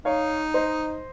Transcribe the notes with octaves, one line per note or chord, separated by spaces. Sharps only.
D#4 C#5 F5
C5 D#5